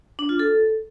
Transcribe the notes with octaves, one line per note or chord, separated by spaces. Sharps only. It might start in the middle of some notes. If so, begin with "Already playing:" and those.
D4
F4
A4